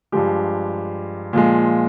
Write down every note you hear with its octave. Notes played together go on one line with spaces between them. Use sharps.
G2 F3 G#3 G4
A#2 F3 G#3